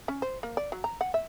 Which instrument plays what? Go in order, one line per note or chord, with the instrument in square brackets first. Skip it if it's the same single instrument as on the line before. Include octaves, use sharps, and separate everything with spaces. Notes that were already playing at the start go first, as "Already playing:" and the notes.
[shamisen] C#4
C5
A#3
D5
F#3
A#5
F#5
E5